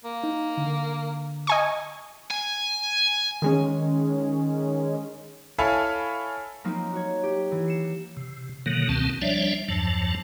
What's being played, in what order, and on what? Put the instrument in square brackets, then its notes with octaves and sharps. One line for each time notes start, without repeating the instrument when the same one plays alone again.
[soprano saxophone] A#3
[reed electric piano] D#4
D3
[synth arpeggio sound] D#5 G#5 C#6
[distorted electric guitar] G#5
[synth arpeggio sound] D#3 G#3 C#4
[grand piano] E4 A4 C#5 F5 G#5 B5
[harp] F3 F#3 A#3 C4 D#4
F#4 C#5
G4
E3
C7 C#7 E7
[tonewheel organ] C3
B2 D3 D#3 F#3 A#3
C#2 B2 D#3 C4 A5
F3 G3 D4 C#5 D5 E5
E2 G2 F3 F#3 A5